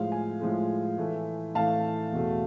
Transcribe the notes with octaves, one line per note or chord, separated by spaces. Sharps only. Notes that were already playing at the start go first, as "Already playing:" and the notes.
Already playing: A2 F3 G#3 F5
G#5
A2 F3 G#3
A2 E3 A3
A2 E3 A3 F5 A5
E2 B2 A3